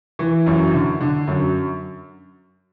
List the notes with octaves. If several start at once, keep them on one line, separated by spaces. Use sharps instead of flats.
E3
F#2
D3
D3
F#2